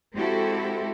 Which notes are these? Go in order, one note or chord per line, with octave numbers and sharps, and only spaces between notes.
G#3 C4 E4 F#4 G4 A4